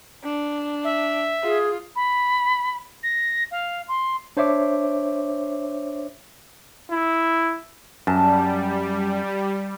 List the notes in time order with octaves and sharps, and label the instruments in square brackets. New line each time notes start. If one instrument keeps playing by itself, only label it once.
[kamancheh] D4
[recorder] E5
[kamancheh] F4 [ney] G#4
[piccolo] B5
A#6
F5
C6
[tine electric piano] D4 C5 C#5 E5 D6
[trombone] E4
[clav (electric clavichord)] F#2 [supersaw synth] G3 [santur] A5